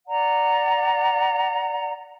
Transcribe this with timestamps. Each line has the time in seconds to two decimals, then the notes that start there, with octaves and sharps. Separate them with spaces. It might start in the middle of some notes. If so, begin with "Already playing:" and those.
0.07 D5 F#5 A#5